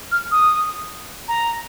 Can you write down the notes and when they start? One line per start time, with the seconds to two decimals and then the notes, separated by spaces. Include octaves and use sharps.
0.12 F6
0.32 D#6
1.28 A#5